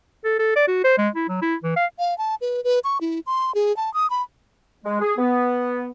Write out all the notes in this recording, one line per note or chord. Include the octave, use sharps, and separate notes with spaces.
A4
A4
D5
F#4
C5
G#3
E4
F#3
E4
E3
F5
F5
A5
B4
B4
C#6
E4
C6
G#4
A5
D#6
B5
G#3
G#4
B3